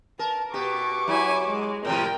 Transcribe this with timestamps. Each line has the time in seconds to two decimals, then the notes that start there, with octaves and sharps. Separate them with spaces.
0.19 A#4 A5
0.54 B2 G4 C#6 D6
1.08 F#3 E4 G#5
1.45 G#3
1.85 A2 C3 F3 A#4 G5